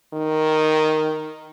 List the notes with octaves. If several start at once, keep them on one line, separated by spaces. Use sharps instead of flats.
D#3